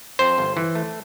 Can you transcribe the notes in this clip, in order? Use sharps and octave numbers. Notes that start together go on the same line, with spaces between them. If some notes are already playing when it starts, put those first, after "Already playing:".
F2 C5
G1
E3
A3